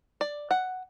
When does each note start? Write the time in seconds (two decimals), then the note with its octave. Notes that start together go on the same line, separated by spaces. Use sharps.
0.21 D5
0.51 F#5